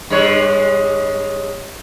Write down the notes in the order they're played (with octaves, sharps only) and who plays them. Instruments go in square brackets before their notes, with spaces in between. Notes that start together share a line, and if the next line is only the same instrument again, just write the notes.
[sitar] G2 G#3 C#5